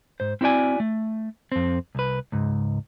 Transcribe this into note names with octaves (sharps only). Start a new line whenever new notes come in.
G#2 C5
C4 E4 F#4 D5 G#5
A3
F2 C4
C2 B4
C#2 G#2